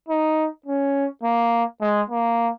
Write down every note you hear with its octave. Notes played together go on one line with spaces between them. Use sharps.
D#4
C#4
A#3
G#3
A#3